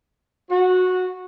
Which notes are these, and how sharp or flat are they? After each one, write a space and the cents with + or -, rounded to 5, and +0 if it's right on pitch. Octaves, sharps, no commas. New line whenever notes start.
F#4 -15